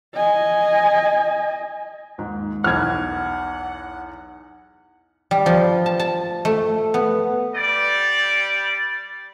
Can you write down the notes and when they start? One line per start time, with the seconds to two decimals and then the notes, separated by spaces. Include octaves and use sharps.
0.14 D#5 G#5
2.18 D#2 G#2
2.64 B1 E2 F#5 F6 G#6
5.31 G3
5.46 F3
5.86 A5
5.99 A5
6.45 A3
6.94 B3
7.56 G3 D5